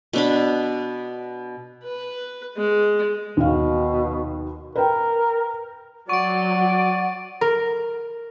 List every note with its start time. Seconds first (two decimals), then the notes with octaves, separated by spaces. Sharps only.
0.13 B2 D4 B5
1.84 B4
2.57 G#3
3.37 D#2 B2 F5
4.76 A#4 B4 G5
6.09 F#3 D5 F#5 C#6 D7
7.41 A#4